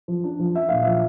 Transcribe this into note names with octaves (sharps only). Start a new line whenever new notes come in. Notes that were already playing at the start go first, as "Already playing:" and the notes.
F3
D4
F3
D4 E5
A#2 F5
F3 E5